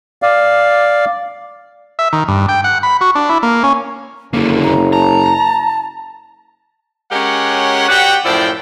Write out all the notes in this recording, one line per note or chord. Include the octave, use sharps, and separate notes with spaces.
D5 F5
E5
D#3
G2
G5
F#5
B5
F#4
D4
E4
A#3
C#4
F#1 D3 A#3 A4
A#5
A5 A#5
G#3 C#4 G4 A#4 C#5 F#5
F#4 G4 B4 D5 F#5 G5
F#2 A2 F3 E4 D5 G5